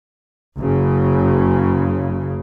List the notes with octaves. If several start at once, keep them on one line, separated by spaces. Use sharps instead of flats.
F#1 C#3